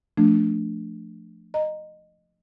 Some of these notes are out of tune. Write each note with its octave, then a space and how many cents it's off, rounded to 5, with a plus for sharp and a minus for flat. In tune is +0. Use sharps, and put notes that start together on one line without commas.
F3 +0 A3 +0 D4 +0
D#5 -15 A#5 +0